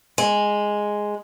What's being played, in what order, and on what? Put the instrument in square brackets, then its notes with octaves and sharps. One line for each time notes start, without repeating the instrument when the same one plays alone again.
[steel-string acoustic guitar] G#3